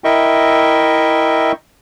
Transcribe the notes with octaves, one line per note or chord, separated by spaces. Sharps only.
E4 A#4 D#5 E5 G5 C#6